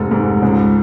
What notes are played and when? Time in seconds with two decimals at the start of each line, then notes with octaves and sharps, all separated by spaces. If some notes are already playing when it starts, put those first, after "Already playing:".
Already playing: F1 G#2 A4
0.11 G#2
0.42 C#2